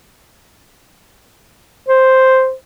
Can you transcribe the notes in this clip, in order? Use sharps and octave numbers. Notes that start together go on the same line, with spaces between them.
C5